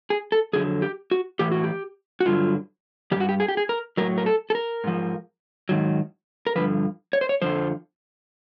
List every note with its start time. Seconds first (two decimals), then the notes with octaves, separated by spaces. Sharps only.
0.10 G#4
0.32 A4
0.53 F2 D3 F#3 G#4
0.82 G4
1.11 F#4
1.39 A2 E3 G4
1.51 F#4
1.64 G4
2.20 F#4
2.26 G2 D3 F#3 F4
3.11 E3 G4
3.16 G2 F#4
3.29 G4
3.40 G#4
3.48 G4
3.57 G#4
3.69 A#4
3.97 A2 F#3 A#4
4.18 A#4
4.26 A4
4.50 A4
4.55 A#4
4.84 G#2 F3
5.69 G#2 D#3 F#3
6.47 A#4
6.56 G2 D3 F3 B4
7.13 C#5
7.21 C5
7.29 C#5
7.42 F2 D3 F3 C5